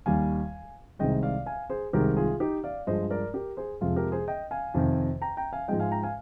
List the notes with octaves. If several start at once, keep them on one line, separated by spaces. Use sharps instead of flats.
D#2 D#3 G3 F5 G#5
C2 C3 D#3 G#3 D#5 G5
D5 F5
F5 G#5
G#4 C5
C2 C3 D#3 G#3 G4 A#4
F4 G#4
D#4 G4
D5 F5
G2 F3 G#3 C5 D#5
A#4 D5
G4 A#4
G#4 C5
F2 C3 F3 G#3 F4 G#4
G4 A#4
G#4 C5
D#5 G5
F5 G#5
F2 C3 D#3
G5 A#5
G5 A#5
F5 G#5
G#2 F3 G#3 D#5 G5
F5 G#5
G5 A#5
F5 G#5